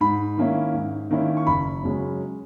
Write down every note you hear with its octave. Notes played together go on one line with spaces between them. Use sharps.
G#2 B5
D#3 A#3 C#4 E4
G#2
D#3 A#3 C#4 E4
C#6
F#1 B5
F#2 C#3 G#3 C#4